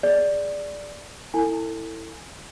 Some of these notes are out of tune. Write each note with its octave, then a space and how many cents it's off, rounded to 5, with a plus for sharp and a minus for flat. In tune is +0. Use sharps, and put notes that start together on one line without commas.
G#4 +0 D5 +0
E4 +0 A4 +30 G#5 +0